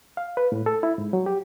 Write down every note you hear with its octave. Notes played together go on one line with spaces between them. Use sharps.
F5
B4
A2
A4
E4
G#2
F#3
G4